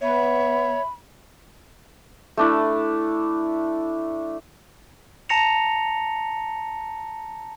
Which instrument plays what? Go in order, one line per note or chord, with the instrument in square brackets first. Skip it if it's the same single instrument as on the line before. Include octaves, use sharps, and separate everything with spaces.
[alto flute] B3 [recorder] C#5 [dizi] E5 [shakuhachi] B5
[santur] A3 D4 E4
[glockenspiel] A5 A#5 A#6 C#7 F7